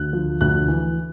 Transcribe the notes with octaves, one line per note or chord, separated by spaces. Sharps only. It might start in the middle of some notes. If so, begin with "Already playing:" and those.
Already playing: D2 F#6
F3
D2 F#6
E3